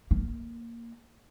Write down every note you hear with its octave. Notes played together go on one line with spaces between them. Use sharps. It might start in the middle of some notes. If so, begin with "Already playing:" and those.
A#3